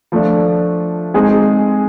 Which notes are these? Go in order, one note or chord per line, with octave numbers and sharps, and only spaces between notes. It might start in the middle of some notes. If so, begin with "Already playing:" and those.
F3 A3 D4
G#3 C4 D#4 G#4